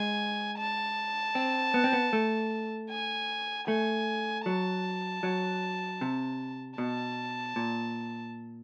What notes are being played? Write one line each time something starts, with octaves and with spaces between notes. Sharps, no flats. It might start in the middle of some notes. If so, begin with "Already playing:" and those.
Already playing: G#3 G#5
A5
C4
B3
C4
B3
A3
G#5
A3 G#5
F#3 A5
F#3
C3
B2 A5
A#2